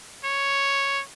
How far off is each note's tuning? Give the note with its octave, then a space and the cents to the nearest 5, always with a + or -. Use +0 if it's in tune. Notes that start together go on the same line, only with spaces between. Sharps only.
C#5 +0